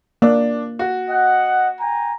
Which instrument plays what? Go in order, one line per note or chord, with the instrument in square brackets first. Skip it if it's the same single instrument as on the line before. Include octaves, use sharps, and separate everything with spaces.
[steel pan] A#3 [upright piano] D4
[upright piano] F#4
[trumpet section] D#5 F#5
G5 G#5 A#5